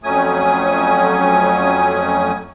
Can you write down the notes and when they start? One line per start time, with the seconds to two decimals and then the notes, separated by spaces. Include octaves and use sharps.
0.04 F2 F#3 A3 C#4 G#5 D#6